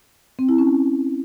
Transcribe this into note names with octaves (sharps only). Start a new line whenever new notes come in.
C4
E4
C#4